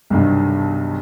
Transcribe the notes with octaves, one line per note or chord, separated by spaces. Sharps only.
B1 G2 C3 D#3